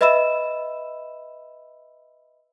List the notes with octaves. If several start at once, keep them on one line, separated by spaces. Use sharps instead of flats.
B4 D#5 E5 B5 E6 E7